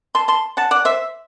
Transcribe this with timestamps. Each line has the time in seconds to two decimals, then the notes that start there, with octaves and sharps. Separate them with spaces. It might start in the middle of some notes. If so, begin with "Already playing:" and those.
0.15 A5 C6
0.28 A5 C6
0.57 F#5 A5
0.71 D5 F#5
0.85 C5 E5